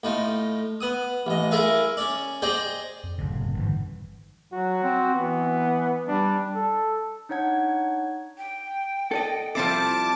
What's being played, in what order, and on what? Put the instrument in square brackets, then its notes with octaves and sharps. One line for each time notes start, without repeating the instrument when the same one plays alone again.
[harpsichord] A2 D#4 F4
B3 D#6
A1 D#5
E4 F4 G#4 A#4 E5 F5
C#4 D5
G#4 C5 D5 D#5 G5
[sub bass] F2
[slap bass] F#1 A2 C3
[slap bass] G1 E3 [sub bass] G#2
[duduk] F#3 [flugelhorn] F#4
[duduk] C4
[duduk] E3 [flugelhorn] B3
[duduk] G3 [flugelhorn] D4
[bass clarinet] A4
[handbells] D4 D#4 C#5 F#5 G#6
[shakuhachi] G5
[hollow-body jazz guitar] A4 D5 D#5
[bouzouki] F3 G3 E4 [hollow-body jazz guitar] C4 A4 [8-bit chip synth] A5 D6